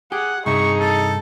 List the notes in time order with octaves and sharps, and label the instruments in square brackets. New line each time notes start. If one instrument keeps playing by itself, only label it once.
[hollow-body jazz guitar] G4 [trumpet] G#4 [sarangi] F#5
[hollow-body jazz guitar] G2 C3 E5 [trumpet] D#4 [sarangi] G#4 [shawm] C#6
[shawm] A4